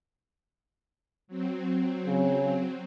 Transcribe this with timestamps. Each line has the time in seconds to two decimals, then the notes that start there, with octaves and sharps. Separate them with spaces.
1.28 F#3 C4
2.07 C#3